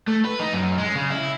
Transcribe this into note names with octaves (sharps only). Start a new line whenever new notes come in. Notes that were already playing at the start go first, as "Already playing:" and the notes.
A3
B4
D#4
F#2
G#3
C#3
E4